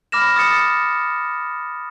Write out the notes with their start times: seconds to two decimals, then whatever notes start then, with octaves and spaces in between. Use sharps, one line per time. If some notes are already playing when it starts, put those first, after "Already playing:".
0.12 B5 D6 F6 A#6 E7
0.36 D#6 A6 C#7 E7